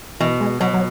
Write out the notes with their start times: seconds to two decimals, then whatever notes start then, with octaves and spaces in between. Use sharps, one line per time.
0.20 B2 E3
0.40 G#3
0.60 B2 F#3
0.73 F#3